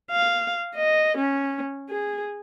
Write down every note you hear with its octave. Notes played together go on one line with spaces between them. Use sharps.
F5
D#5
C#4
G#4